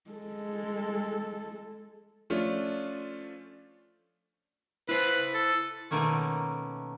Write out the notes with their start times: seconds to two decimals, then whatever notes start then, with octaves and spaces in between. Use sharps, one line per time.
0.10 G#3 A4
2.30 F3 A3 C#4 D4 F4
4.89 E4 B4 C5
5.34 A4
5.91 B2 D#3 A3 A#3 C#4